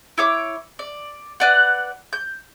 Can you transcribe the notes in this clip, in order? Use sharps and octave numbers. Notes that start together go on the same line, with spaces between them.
E4 C#5 D6
D5
B4 D5 F#5
G6